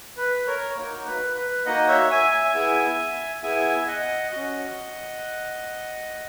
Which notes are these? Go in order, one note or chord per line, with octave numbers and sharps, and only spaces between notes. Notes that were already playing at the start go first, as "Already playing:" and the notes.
B4
A#4 C#5
A#3 D#4 F#4 A#4 C#5
B4
B4
A#3 D#4 F#4 D#5 F#5
C#5 E5
E5 G#5
E5 G#5
B3 E4 G#4
B3 E4 G#4 E5 G#5
G#5
D#5 F#5
C#4 F#4 D#5 F#5